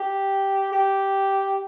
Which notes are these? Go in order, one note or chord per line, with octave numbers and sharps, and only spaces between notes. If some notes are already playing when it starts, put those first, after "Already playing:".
Already playing: G4
G4